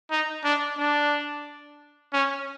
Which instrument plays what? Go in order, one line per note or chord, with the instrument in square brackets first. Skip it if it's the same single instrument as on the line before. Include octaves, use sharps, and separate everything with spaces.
[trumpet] D#4
D4
D4
C#4